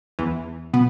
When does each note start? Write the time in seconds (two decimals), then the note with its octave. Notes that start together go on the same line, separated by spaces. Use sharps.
0.19 E2 E3
0.74 B2 B3